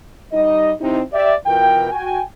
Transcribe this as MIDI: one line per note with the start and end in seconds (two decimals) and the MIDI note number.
0.33 0.72 55
0.33 0.72 63
0.33 0.72 75
0.81 1.00 48
0.81 1.00 60
0.81 1.00 63
0.81 1.00 64
1.13 1.33 67
1.13 1.33 74
1.13 1.33 76
1.46 1.88 47
1.46 1.88 52
1.46 1.88 65
1.46 1.88 70
1.46 1.88 79
1.91 2.21 66
1.91 2.21 79
1.91 2.21 80